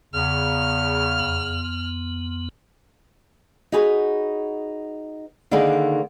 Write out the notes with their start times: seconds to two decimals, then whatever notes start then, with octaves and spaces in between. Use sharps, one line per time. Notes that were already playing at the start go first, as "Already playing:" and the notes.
0.14 E2 C#3 F6
1.20 F2 B3
3.72 D#4 F#4 G#4 B4 C#5
5.51 D3 D#3 A#3 D#4 G#4 B4